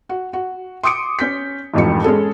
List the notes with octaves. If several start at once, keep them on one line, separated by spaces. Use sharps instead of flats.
F#4
F#4
C6 D6 D#6 C#7 D7
C#4 G6 B6
E1 A1 F2 G#2 C#7
G#3 C#4 G#4 A4